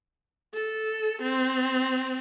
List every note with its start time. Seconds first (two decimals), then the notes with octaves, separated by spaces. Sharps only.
0.55 A4
1.23 C4